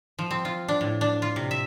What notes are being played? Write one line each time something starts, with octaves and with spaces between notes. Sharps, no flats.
F3
C4
F4
D4
A2
D4
F4
C3
E5